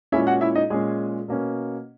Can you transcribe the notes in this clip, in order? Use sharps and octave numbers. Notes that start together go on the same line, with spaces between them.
A#2 G#3 C#4 E4 E5
F#4 F#5
E4 E5
D#4 D#5
A#2 G#3 C#4 G#4
B2 A#3 C#4